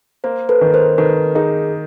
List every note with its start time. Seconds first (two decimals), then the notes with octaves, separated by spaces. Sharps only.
0.24 A#3 A#4 C5
0.49 A4 B4
0.61 D#3
0.74 A#4 C5
0.98 D#3 A4 B4
1.35 D#4 G#4 A#4